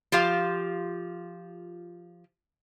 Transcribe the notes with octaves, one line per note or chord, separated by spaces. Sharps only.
F3 F4 G4 F5